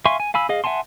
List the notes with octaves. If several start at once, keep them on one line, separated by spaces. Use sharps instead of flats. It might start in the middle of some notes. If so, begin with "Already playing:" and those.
E5 F5 G#5 C6 C#6
G#5
F5 G#5 B5 E6
G#4 D#5 F5
E5 F#5 G#5 A5 C6